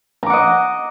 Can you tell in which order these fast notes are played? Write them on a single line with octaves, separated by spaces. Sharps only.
A#5 D6 F#5 D#5